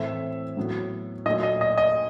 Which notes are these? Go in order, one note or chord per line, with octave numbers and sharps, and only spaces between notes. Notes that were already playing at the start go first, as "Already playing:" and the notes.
Already playing: A2 E3 A3 C4 E5
A2 F#3 B3
A#2 F#3 A3 D#5
D#5
D#5
D#5